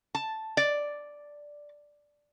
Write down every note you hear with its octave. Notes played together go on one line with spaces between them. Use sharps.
A5
D5